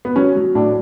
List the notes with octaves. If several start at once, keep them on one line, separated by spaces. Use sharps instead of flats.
B3
F#3 C#4
F#3
A2 D4